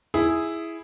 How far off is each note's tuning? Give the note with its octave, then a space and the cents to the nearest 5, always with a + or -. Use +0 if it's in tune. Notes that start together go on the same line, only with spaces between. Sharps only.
E4 +0 G#4 +0